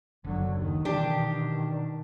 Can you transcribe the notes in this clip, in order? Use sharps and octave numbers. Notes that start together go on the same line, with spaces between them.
F#1 D3 F#3
D#2 D#3
B2 D#3 E3 D4 G4